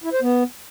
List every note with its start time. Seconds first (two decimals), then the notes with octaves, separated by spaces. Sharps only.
0.04 E4
0.13 C5
0.22 B3